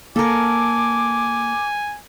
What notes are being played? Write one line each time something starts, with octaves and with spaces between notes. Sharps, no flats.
A#3 A4 A#4 G#5 D6